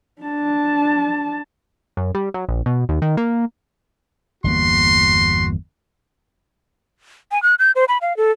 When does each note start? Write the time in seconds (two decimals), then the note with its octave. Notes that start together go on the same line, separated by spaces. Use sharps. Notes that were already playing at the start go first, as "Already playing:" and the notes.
0.22 D4 A5
1.97 F#2
2.15 G3
2.34 F#3
2.49 A#1
2.66 B2
2.89 D#2
3.02 D#3
3.17 A#3
4.44 G1 E2 A#3 F#4 C6
7.32 G#5
7.43 F#6
7.59 G6
7.76 C5
7.88 B5
8.01 F5
8.17 A4